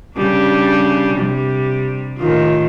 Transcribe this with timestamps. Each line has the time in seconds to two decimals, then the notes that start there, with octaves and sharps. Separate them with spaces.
0.17 C#3 G3 D4
1.14 C3 G3
2.19 A2 D#3 F4